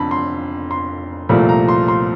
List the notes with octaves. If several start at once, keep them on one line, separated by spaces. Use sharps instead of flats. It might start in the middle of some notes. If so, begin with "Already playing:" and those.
Already playing: F1 F2 D3 A5 B5
C6
C6
C2 A#2 F3 A3 B5
A#5
C6
C6